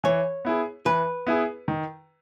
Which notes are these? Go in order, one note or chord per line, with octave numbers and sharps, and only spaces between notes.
E3 C#5
B3 E4 G#4
E3 B4
B3 E4 G#4
D#3